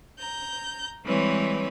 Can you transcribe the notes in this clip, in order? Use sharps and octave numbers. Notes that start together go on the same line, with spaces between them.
A#5 G6
E3 G3 G#3 C4 B4 C#5